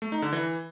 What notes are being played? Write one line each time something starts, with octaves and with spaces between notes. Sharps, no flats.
A3
D#4
D3
E3